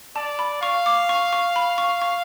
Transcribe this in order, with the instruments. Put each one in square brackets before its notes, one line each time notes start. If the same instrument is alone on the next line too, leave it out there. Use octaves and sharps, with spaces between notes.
[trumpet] D5 [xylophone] A5
[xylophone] B5
[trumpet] F5 [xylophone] C#6
[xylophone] D6
C#6
C#6
B5
C#6
C#6